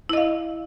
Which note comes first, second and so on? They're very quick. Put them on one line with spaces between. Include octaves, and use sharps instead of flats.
E4 D#5 F5